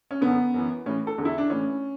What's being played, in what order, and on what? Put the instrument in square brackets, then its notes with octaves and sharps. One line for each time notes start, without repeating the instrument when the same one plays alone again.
[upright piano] C#4
F#2 D3 B3
F#2 E3
A2 E3 C#4
A4
E2 D3
E4
D4
A2 E3 C#4